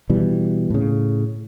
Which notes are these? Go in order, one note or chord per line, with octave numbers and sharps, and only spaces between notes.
B2 E3 G3
A2 C#3